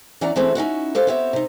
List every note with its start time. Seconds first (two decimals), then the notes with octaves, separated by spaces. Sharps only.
0.21 E3 C#4 D5 F#5 A#5
0.36 E3 A3 C4 C#4 G#4 E5
0.55 C#4 D#4 E4 F#4
0.95 G4 A4 C5 F5
1.07 B3 C4 G4 C#5 D5 E5
1.33 C3 D#4